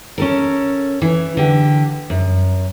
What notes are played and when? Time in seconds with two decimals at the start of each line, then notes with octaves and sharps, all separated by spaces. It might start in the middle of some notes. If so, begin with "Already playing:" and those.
0.18 C#4 A4 A#4
1.02 E3
1.37 D3 G4
2.10 F#2